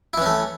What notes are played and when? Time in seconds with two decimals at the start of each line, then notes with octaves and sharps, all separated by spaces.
0.13 E4
0.18 E3
0.22 C#4
0.26 A3